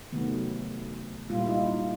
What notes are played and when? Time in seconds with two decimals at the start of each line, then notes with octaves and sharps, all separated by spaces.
0.12 C3 D#3 F#3 A3 B3
1.29 A#2 G3 A#3 F4
1.38 E4
1.46 D#4 F4